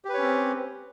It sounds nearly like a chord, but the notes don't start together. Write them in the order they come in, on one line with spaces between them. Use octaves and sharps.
G4 B4 C#5 C#4 C4